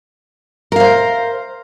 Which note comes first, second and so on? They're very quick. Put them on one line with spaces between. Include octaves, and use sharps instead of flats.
A#4 F5 C5